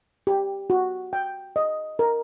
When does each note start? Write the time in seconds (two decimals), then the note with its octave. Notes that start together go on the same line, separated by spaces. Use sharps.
0.27 G4
0.70 F#4
1.13 G5
1.56 D#5
1.99 A#4